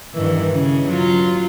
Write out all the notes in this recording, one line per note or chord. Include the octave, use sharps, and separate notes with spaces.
G2 D#3 E3
C#3
F#3 F4